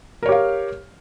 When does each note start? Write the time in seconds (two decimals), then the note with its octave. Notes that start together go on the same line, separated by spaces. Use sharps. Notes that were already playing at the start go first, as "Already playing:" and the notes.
0.23 A#4
0.26 C#5
0.29 G4
0.32 F5